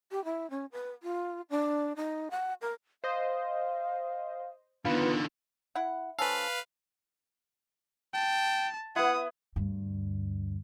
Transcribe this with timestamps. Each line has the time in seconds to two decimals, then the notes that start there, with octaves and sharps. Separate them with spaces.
0.11 G4
0.25 E4
0.50 C#4
0.72 B4
1.03 F4
1.50 D4
1.96 D#4
2.31 F#5
2.62 A#4
3.04 C5 D#5 F5
4.85 D3 D#3 B3 F4 B4 C#7
5.75 E4 F#5
6.19 F3 C#4 A4 B4 F5
8.14 G5 A5
8.96 B3 E4 F#5 D#6
9.56 D2 G2